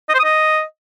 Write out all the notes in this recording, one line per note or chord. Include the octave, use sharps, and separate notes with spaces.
D#5
C5
D#6
D#5